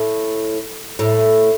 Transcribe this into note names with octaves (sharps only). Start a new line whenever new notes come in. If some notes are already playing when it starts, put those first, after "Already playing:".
Already playing: A2
A2